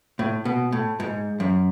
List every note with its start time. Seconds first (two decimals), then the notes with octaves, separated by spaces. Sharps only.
0.19 A2
0.45 B2
0.72 A2
1.00 G#2
1.40 F#2